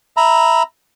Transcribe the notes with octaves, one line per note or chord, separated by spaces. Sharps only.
E5 A#5 B5